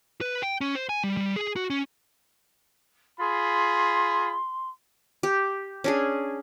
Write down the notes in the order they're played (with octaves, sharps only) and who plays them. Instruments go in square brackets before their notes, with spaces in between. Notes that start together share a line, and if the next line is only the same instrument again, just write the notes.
[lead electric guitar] B4
G5
C#4
C5
G#5
G3
G3
G#4
F#4
C#4
[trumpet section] F4 G#4 B5 [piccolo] C6
[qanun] G4
C#4 D4 G#4